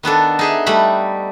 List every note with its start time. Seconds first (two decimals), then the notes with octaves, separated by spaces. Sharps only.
0.03 D#3 B3 D4 A4
0.39 D#4 G#4 E5
0.66 G3 A3 F#5 B5